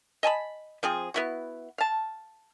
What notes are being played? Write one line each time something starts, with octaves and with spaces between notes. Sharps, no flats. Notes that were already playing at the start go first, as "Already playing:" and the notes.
D#5 G#5 A5 B5
F3 C4 G#4
B3 E4 F#4
F5 A5